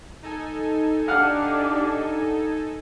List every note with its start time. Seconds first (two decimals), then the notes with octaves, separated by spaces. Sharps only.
0.23 D#4 A4 G#5
1.08 D4 G4 F5 F#5 F6